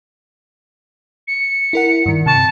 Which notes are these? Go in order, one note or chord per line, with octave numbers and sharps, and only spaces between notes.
C#7
E4 A#4 F#5
G2 D#3
C3 A5 C#6